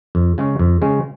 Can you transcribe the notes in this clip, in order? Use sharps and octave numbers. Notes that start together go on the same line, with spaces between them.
F2
C#3 G#3 C#4
F2
C#3 G#3 C#4